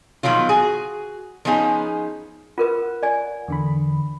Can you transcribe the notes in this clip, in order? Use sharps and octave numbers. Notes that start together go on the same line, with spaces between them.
B2 D#3 F3 F#3 F4
F#4 G#4
F3 B3 C#4 D#4 G#4
F4 A#4 B4 F#5
D5 G#5
E2 D3 B5